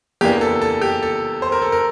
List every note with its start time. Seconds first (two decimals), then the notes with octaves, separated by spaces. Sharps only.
0.21 E2 E3 A#3 D4 G4
0.41 A4
0.62 A4
0.82 G4
1.02 A4
1.42 C5
1.52 A#4
1.62 A4
1.72 A#4